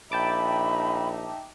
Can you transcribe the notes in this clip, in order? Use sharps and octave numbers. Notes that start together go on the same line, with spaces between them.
A#1 D#4 E5 G5 A5 B5 D6